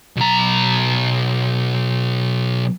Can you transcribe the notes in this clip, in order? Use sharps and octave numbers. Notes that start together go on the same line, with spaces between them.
B1 A#5